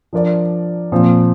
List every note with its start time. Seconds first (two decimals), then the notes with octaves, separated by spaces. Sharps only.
0.13 F3 D4 A#4 D5
0.92 A#2 F3 C4